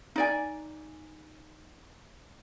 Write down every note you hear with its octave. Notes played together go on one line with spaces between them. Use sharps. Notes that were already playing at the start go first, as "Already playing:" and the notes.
D#4 D5 G#5